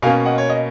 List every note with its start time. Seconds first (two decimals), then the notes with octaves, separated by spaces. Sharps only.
0.02 B2 A#3 C#4 F5 G#5
0.26 D#5 F#5
0.38 C#5
0.49 D#5